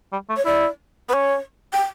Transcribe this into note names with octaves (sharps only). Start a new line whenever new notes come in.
G3
A3
C#5
E4 D5
B3 B4
C#4 C#5
G5